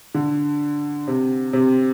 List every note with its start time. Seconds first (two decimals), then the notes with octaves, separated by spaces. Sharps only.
0.15 D3
1.08 C3
1.53 C3